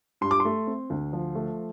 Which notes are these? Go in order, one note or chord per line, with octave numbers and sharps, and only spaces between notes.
G2 C6
D6
C6
A3
C4
D2
F3
A3